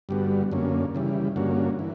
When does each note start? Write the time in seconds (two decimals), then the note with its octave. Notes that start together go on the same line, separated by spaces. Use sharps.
0.09 G2 D3 G3 B3 F#4
0.52 F#2 D3 A#3 C#4
0.95 C#3 E3 G3
1.36 G2 D3 A#3 C#4 F#4
1.79 E3